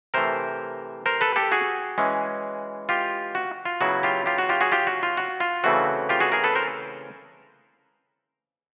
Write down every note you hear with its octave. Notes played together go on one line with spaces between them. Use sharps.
C3 E3 A3 A#4 C5
A#4 C5
A4 B4
G4 A4
F#4 G#4
E3 G#3 C#4
F4 G4
F#4
F4
C#3 F#3 B3 E4 F#4
F4 G4
F4 G4
F#4
F4 G4
F#4 G#4
F4 G4
F#4
F4
F#4
F4
C#3 E3 A3 C4 F#4
F4 G4
F#4 G#4
G#4 A#4
A4 B4
A#4 C5